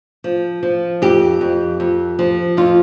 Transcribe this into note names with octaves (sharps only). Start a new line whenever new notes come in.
F3
F3
F2 G4
F2
F2
F3
F2 F4